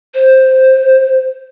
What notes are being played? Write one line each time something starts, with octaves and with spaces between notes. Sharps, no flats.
C5